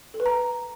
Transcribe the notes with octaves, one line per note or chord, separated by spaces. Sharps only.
A4
B4
A#5